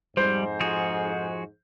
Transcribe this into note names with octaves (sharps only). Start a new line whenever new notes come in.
F2 G#2 G3 C5
F3 F#4 G#4